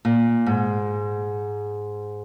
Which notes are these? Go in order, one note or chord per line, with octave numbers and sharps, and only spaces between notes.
A#2
G#2